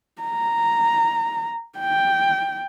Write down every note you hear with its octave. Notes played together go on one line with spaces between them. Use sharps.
A#5
G5